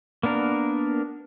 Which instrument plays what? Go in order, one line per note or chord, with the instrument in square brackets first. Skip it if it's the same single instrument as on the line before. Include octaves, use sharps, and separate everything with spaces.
[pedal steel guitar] A#3 B3 D4 A#4